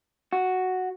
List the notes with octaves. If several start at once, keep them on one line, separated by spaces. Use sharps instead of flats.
F#4